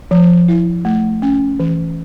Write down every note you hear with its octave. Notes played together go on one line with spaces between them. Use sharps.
F3
E4
A3
C#4
E3